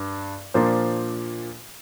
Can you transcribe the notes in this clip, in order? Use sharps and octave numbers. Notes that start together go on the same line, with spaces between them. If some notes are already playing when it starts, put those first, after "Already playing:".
Already playing: G2 D4
A#2 F3 A#3 D4 C5